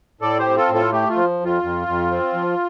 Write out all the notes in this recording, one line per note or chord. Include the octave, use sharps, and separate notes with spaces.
A2 A4 D5
G4 C5
C4
F4 A4
A2
F4 A4
A3 G4
F4
F3
F2 F4
F2
F2
C4
F3